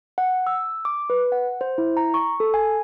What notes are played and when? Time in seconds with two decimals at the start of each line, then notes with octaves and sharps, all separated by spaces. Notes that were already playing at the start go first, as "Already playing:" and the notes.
0.18 F#5
0.47 E6
0.85 D6
1.10 B4
1.32 F#5
1.61 C5
1.78 E4
1.97 A#5
2.14 C#6
2.40 A4
2.54 G#5